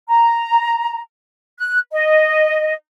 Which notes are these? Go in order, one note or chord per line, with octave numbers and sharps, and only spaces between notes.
A#5
F#6
D#5